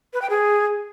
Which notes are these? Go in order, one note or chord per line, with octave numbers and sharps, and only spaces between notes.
B4
G5
G#4